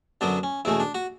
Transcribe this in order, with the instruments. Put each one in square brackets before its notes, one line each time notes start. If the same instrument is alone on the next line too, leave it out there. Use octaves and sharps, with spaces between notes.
[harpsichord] F#2 D3 F#3 B3 D4
C#4
E2 B2 A3 C#4 E4
D4
F#4